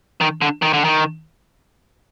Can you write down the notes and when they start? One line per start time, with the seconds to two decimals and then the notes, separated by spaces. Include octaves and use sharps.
0.21 D#3
0.42 D3
0.62 D#3
0.73 D3
0.84 D#3